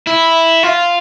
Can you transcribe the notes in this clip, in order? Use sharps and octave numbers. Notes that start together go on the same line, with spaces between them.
E4
F4